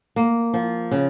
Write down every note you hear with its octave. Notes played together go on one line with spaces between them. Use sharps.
A#3
F3
C#3